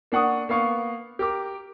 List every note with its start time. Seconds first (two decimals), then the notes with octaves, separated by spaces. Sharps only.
0.12 A#3 D4 F#5 C#6 D#6
0.49 A#3 B3 F5 C#6
1.19 G4 A#4 D6